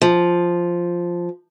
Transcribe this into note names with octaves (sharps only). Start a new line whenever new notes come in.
F3